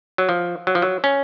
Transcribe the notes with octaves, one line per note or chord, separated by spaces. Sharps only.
F#3
F3
F#3
F3
F#3
C#4